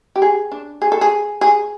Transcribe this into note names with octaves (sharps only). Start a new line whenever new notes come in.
G4
G#4
D4
G#4
A4
G#4
G#4